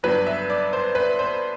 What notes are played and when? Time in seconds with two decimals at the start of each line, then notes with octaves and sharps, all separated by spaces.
0.03 G1 G2 F#3 B3 D4 B4
0.27 E5
0.50 D5
0.73 C5
0.95 B4
1.19 C5